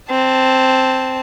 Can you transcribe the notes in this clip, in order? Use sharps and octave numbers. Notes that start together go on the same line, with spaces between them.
C4 A5